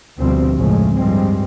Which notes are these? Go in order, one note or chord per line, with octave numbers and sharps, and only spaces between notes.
D2 B2 F3 G3 C4
A1 F2 C#3 F3 G#3 A3
G2 F3 G3 G#3 C4